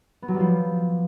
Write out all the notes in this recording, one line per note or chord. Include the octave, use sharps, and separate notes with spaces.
B3
F#3
G3
F3